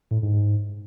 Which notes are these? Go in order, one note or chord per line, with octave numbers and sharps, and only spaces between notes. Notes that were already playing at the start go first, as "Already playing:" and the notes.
A2
G#2
G#2